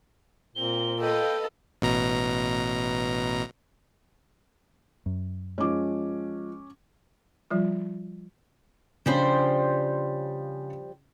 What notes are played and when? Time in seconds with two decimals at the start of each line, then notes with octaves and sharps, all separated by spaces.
0.55 A#2 C4 G7
1.00 A4 B4 D#5 F5 G5
1.82 A1 B2 A#5
5.06 F#2
5.58 F3 G#3 C#4 D6
7.50 F3 G3 F4
9.06 C#3 F3 G3 C#4 D4 C5